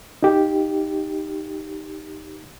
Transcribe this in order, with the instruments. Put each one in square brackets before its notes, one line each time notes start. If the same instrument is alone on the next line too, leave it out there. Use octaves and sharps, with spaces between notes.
[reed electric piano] D#4 G4